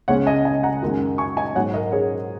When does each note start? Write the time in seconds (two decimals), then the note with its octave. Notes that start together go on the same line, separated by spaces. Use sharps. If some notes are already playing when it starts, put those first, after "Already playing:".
0.08 C#2 C#3 G#3 C#4 C#5 F#5
0.26 D#5 G#5
0.45 D#5 G#5
0.63 F#5 A#5
0.82 F#2 D#3 G#3
1.18 G#5 C#6
1.37 D#5 G#5
1.55 G#2 F#3 D#4 C#5 F#5
1.74 A#4 D#5
1.92 G#4 C#5